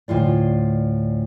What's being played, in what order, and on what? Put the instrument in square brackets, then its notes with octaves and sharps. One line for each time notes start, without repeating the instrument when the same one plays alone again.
[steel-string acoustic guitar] D2 A2 C3 F4 D5